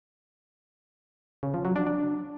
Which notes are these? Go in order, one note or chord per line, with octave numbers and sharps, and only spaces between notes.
C#3
F3
F#3
D4
D4